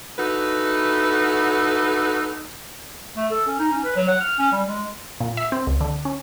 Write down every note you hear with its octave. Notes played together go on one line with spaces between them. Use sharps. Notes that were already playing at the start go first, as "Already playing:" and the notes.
D#4 E4 F#4 A4 B4
A3
A4
C#4
D#4
C#4
B4
F#3
F#5
F6
C#4
G3
G#3
A#2
E5
C4
C#2
D3
C#4